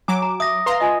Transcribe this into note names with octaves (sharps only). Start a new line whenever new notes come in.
F#3 G#5 A#5 D6
A#5
E5 D#6 A#6
B4 F5 A#5 C6
F4 D#5 G#5